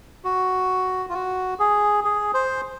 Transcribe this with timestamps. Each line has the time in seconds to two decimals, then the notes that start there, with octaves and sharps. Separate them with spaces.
0.25 F#4
1.09 F4
1.14 F#4
1.60 G#4
2.05 G#4
2.34 C5